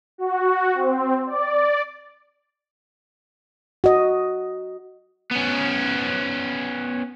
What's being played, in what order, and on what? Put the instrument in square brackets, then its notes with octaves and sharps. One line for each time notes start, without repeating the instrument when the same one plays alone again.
[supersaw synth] F#4
C4
D5
[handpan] F#4 D#5
[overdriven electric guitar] B3 C#4